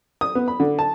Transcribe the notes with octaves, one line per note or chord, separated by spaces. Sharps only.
D#6
B3
B5
D3
A5